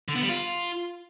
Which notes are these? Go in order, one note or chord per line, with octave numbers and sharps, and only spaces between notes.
D3
B3
G3
F4